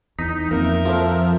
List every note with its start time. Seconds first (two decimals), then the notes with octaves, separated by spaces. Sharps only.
0.19 E2 D#4 B6
0.51 F2 A#3 A#4 E5
0.85 F3 F4 A4 C5